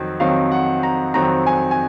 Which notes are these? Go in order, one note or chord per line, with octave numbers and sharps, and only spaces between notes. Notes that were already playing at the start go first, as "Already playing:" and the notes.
Already playing: F2 D#3 F#3 C4
F2 D#3 F#3 C4 F5
F#5
A#5
F2 D#3 F#3 C4 A#5
G#5
G#5